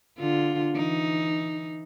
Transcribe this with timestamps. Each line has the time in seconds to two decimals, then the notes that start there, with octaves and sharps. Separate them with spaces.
0.19 D3 F4
0.74 E3 D#4